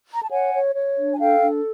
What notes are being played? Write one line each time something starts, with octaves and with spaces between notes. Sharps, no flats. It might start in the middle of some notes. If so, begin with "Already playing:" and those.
A#5
A5
C#5 F#5 G#5
C#5
C#5
D4
G#5
A4 F5 G5
D4